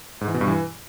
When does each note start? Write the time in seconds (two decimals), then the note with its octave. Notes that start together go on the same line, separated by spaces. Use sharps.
0.21 G#2
0.28 E3
0.34 B2
0.41 G2
0.47 E3